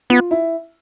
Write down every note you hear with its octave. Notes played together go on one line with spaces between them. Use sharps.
B3 F4
E4